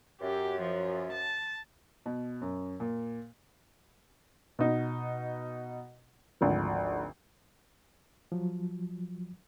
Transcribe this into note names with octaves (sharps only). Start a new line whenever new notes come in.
F#2 G4
F3
A5
B2
F#2
A#2
B2 D#4
G#1 D2 G#2 F3
F3 F#3